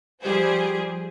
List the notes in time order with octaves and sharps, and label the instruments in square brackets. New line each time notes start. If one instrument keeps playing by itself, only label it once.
[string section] F3 G3 G4 G#4 C5